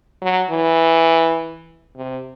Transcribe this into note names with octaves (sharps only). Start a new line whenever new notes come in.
F#3
E3
C3